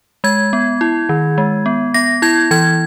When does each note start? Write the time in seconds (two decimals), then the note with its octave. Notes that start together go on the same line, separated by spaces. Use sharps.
0.24 G#3 G#6
0.53 B3
0.81 E4
1.09 D#3
1.38 G#3
1.66 B3
1.94 B3 A#6
2.22 E4 G#6
2.51 E3 G#6